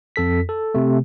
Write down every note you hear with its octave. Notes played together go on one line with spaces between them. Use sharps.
F2 A4 B6
A4
C3 A3